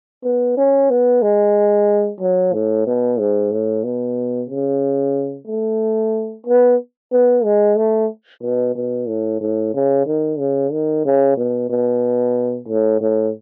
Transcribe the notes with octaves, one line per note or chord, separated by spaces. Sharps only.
B3
C#4
B3
G#3
F#3
A2
B2
G#2
A2
B2
C#3
A3
B3
B3
G#3
A3
B2
B2
A2
A2
C#3
D#3
C#3
D#3
C#3
B2
B2
A2
A2